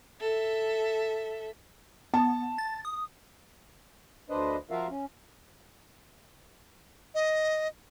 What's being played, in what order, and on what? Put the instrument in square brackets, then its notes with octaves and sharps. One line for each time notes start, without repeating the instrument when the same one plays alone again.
[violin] A4 E5
[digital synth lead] B3 [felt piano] A5
[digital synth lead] A6
D#6
[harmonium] D2 D4 B4 C5 D#5
F3 F4 F#4 A#4 E5 F5
C#4
[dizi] D#5